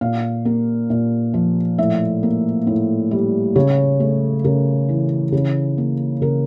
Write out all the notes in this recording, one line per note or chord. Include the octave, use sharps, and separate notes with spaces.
A#2 F5
A#3
A#2
F3
A2 E5
A#3
A2
G3
C#3 C#5
A3
C#3 A#4
E3
C#3
A#3
C#3 A#4